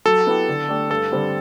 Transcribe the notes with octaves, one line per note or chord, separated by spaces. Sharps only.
F#3 A4
B3 E4 G4
D3
A3 D4 G4
G2 A4
D3 G3 C4